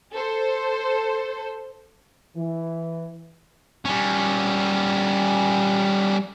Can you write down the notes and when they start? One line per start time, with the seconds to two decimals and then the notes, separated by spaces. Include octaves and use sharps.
0.12 A4 C5
2.36 E3
3.85 G3 C#4